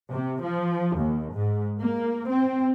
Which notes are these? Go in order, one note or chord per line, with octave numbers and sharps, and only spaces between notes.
C3
F3
D#2
G#2
A#3
C4